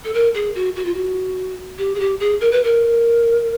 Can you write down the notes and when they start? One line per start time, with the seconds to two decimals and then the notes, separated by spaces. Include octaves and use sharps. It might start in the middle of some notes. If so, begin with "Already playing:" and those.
0.04 A4
0.14 A#4
0.34 G#4
0.55 F#4
0.76 F#4
0.85 F4
0.94 F#4
1.78 G4
1.95 G#4
1.99 G4
2.20 G#4
2.40 A#4
2.51 B4
2.63 A#4